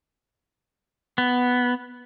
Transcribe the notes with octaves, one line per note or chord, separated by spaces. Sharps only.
B3